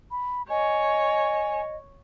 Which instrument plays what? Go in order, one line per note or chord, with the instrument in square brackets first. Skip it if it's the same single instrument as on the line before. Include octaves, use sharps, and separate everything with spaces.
[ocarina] B5
[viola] C#5 [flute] D#5 [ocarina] G#5